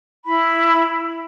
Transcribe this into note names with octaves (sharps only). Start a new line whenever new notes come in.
E4 B5